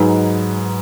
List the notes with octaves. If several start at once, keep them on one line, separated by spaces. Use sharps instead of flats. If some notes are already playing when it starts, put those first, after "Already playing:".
Already playing: G#2 F#3 D#4 G#4 B4